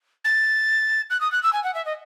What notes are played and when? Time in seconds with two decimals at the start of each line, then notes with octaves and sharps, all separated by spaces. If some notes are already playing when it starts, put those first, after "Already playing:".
0.24 A6
1.10 F#6
1.20 D#6
1.32 F#6
1.43 E6
1.52 G#5
1.64 F#5
1.74 E5
1.85 D#5